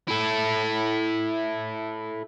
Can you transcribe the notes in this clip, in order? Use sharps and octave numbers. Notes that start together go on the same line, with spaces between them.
E4 A4